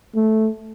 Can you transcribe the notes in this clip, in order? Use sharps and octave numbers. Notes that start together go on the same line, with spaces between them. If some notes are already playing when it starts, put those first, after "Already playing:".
A3